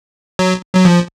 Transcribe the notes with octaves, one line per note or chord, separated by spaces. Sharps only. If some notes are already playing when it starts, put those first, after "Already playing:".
F#3
F#3
F3